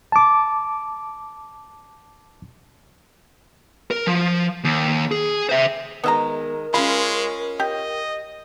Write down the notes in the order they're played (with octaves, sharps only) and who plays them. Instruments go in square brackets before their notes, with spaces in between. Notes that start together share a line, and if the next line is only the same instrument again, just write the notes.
[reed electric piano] A5 D6
[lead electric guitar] A#4
F3
D#2
G#4
C5 E5
[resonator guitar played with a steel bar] D#3 G#3 [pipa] B3 E5 A#5 [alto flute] A#4
[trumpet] G#3 [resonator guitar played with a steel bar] C#4 F4 [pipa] B5
[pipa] G4 [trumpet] D#5